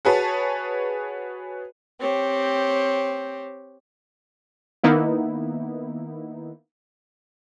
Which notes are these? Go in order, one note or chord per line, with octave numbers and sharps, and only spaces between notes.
F#4 G#4 B4 C#5 A5
C4 G4 C#5
D#3 A#3 B3 D#4 E4